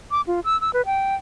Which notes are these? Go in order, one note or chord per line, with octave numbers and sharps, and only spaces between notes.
D6
F4
E6
E6
B4
G5